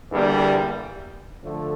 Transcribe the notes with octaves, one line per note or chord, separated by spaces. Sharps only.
E2 D3 G3 A#3
D3 F3 A3